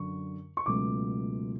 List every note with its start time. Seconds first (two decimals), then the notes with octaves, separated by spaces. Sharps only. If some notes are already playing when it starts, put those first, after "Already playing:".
Already playing: F#2 D3 F#3 C#6
0.57 C#6
0.66 C#2 B2 F#3 A3 D6